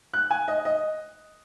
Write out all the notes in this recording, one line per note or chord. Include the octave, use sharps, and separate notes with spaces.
F#6
G#5
D#5
D#5